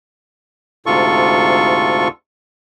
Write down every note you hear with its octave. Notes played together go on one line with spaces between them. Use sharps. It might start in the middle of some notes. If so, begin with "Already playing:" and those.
D2 G#2 C3 F4 A4 C#6